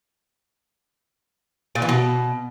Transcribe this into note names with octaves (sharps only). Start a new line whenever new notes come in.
A#2
E3
B2